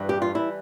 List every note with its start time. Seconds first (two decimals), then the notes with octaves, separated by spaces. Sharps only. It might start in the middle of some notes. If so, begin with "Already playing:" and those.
Already playing: G2 E3 G3
0.09 G4
0.22 F4
0.35 E3 G3 E4